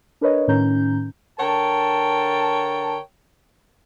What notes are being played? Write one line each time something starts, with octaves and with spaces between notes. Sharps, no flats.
D4 A#4 B4 C#5 D#5
A2 D#3 C#4 A#5 G6
D3 A#4 C#5 G5 A5